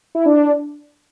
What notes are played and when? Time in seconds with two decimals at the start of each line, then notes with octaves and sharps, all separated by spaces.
0.15 E4
0.26 D4